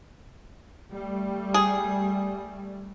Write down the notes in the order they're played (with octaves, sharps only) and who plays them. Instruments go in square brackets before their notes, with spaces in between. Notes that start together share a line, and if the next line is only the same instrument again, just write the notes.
[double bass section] G3 A3
[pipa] G#4